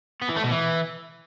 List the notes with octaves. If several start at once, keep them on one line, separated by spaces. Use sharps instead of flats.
B3
E3
A3
B2
E3